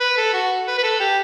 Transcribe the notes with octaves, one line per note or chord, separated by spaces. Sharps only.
B4
A4
F#4
B4
B4
A4
G4